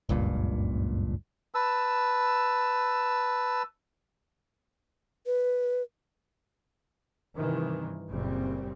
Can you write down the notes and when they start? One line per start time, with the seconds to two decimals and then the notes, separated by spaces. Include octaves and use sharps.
0.09 F#1 C#2 G2 A#2
1.54 B4 A5 E6
5.26 B4
7.36 G2 C3 D#3 E3
8.08 F#1 A#2 C#3 G3 C4